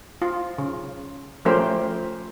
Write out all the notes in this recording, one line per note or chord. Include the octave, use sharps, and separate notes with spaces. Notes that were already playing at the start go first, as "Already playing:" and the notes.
F4
C#3
F3 A3 C#4 G4 A#4 C5